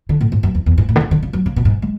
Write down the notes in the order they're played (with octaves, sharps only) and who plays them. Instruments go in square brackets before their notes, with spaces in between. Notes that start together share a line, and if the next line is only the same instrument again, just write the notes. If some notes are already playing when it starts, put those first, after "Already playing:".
[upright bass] D3
A2
G#2
F#2
E2
E2
G#2
A2
D3
C#3
D3
C#3
F#3
C#3
B2
G#2
G#3